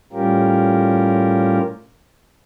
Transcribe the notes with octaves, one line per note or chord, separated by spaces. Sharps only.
A2 G3 C#4 F4 G4 A#4